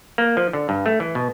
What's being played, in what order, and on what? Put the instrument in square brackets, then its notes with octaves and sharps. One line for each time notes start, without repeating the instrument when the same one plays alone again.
[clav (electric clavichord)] A#3
F3
D3
G2
A3
E3
B2